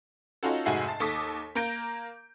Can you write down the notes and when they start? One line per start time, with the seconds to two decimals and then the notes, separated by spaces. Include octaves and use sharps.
0.43 C#4 D#4 F4 F#4 A4
0.66 F1 G#2 F#4 E5 G#5 C7
0.88 A5
1.00 D#2 A4 D6 D#6 B6
1.55 A#3 A#5 G6 D7